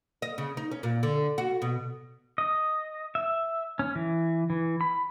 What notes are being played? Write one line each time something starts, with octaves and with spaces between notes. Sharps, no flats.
D#5
C#3
D#4
C#4
A#2
D3
F#4
B2
D#5
E5
C#4
E3
E3
B5